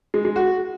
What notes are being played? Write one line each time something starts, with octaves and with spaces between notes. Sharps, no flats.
G#3
G#3
F#4